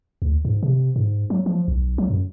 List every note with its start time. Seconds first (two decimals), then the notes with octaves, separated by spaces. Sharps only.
0.22 D2
0.45 G#2
0.63 C3
0.96 G#2
1.30 F#3
1.46 F3
1.68 B1
1.98 F#3
2.10 F#2